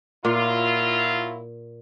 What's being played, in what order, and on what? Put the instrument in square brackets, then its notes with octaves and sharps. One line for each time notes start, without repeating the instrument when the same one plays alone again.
[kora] A#2 [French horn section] F#3 E4 F4